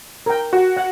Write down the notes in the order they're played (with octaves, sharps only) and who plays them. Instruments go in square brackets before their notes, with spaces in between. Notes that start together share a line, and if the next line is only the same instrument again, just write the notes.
[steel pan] A#4 G5
[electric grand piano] F#4
[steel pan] F#5